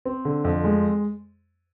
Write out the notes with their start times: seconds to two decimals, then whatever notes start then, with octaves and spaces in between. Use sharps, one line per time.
0.05 C4
0.25 D3
0.44 F2
0.64 G#3